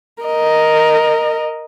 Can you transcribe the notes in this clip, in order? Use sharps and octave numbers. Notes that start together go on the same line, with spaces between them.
A#4 D#5